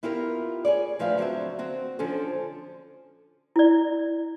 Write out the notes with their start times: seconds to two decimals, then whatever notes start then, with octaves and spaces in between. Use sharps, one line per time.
0.03 B3 E4 F4 G4 A4 A#4
0.65 G#4 C#5 D5
0.99 D2 F3 B4 E5 F5
1.18 D3 F#3 C4 F#4 E5
1.59 C4 F#4
1.99 D3 F3 C#4 A4 C5
3.56 E4 D5